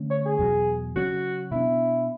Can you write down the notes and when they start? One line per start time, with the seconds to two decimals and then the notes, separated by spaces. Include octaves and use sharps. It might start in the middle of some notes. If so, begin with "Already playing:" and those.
Already playing: D3 A3 C#4
0.11 C#5
0.26 G#4
0.39 E2 B2 F#3
0.96 C#3 F#3 C#4 F#4
1.51 B2 G#3 B3 D4 E4